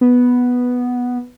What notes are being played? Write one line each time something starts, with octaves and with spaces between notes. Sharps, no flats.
B3